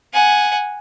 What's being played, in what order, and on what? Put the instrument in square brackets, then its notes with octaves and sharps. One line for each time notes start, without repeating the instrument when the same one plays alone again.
[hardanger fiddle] F#5 G#5